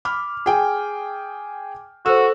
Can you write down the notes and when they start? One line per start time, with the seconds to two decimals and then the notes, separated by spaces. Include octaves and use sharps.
0.05 B5 D6 F6
0.46 G#4 G5 G#5
2.06 F#4 A4 C5 E6